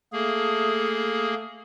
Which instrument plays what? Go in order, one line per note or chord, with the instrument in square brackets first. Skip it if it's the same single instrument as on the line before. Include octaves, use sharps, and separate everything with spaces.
[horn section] A3 [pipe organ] A#3 G#4